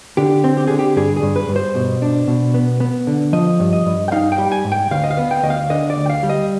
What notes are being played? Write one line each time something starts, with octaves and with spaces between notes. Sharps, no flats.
D3 G4
C4
G4
D3 G#4
G4
G2 G#4
G#4
G2
B4
G2
C5
B2
D4
B2
B3
B3
D3
F3 D#5
G2
D#5
G2
G5
D#4 F5
G5
G3
G#5
G#2
G5
D2 F5
D#5
F5
B3
G5
D2 D#5
F5
D3 D#5
D5
D2
G5
F5
G3
D#5